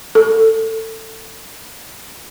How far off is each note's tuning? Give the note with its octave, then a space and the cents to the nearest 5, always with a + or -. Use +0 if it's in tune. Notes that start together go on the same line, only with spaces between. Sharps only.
A4 +20